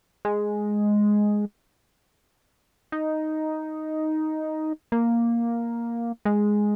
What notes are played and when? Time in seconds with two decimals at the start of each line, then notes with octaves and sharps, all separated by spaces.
0.25 G#3
2.92 D#4
4.92 A#3
6.25 G#3